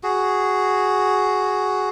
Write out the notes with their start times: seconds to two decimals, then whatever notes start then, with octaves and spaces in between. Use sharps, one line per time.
0.03 F#4 G#4